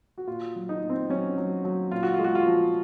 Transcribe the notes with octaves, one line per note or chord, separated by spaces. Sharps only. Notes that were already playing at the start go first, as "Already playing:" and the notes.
F#4
A#2 F4
F#3
D#4
A#2
C4
F#3 C#4
F#3
F#3
A#2 F4
F#4
F4
G#3
F#4
F4
F3